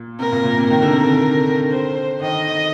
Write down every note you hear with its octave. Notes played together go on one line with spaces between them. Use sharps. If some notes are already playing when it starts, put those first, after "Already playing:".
Already playing: A#2
C3 A#4
A#2
A#2
C3
D#3 A#4
D3
C3
D3
C5
D#3 D#5